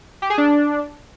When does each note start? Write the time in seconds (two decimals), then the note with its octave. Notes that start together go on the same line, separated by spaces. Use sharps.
0.22 G4
0.30 G#4
0.38 D4